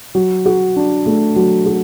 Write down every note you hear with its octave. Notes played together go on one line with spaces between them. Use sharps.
F#3
F#4
D4
A3
F#3
F#4